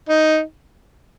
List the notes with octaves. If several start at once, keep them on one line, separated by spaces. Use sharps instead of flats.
D#4